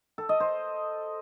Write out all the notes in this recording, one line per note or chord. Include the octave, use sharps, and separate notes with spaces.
A4
D#5
C5